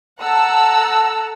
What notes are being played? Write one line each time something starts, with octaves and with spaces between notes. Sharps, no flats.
A4 F#5 A5 A#5 E6